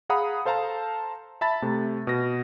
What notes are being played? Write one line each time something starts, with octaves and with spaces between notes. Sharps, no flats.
G#4 F5 F#5 A#5 B5 D#6
A4 C5 F5 A5 A#5
E5 A5 B5 A6
C3 A3
B2 A#6